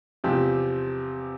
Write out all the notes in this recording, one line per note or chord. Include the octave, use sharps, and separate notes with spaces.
E2 C3 F3 C4 G4